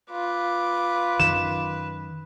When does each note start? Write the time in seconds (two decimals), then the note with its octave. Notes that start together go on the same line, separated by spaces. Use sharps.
0.11 F4 B4 D6
1.20 F#2 D#3 E7